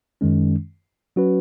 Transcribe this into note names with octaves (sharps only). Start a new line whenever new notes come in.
F#2 D#3 G#3 C#4
F#3 C#4 F#4 B4